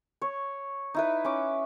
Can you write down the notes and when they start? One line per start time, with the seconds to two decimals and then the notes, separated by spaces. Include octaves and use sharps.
0.22 C#5
0.94 D#4 E4 B4
1.25 C#4 D6